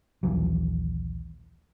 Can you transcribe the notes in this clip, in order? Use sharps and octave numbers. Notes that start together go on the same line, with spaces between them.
A#1 D#2 E3 F#3